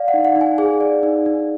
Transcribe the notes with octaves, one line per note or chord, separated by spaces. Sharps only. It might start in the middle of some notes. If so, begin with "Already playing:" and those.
Already playing: D5 F5
F#5
D#4
F#5
D#4
G#5
G#4 G#5
D5
D#4
D#4